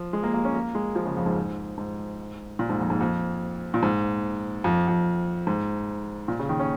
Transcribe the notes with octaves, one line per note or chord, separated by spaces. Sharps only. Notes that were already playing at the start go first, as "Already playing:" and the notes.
Already playing: F3
G#3
A#3
A#3
C#4
A#3
G#3
F3
C#3
F2
G#2
G#2
A#2
G#2
F2
G#2
F2
A#2
G#2
F2
F2
G#2
A#2
C#3
D#3
C#4